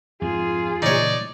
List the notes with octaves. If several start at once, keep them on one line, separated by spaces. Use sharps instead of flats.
F2 G#2 F4 G#4
A#2 C#3 E3 D#4 C#5 D5